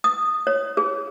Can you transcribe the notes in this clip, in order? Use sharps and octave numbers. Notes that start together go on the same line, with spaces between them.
D#6
C#5
G#4